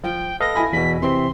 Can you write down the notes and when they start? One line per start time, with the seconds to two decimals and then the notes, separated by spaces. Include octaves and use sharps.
0.04 F3 G5
0.40 A4 B4 D#5 F5 A#6
0.55 E4 G#5 B5
0.73 E2 B2 B6
1.02 C3 E3 C4 C6